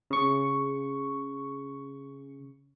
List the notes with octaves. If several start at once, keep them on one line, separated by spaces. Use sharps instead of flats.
C#3 C#6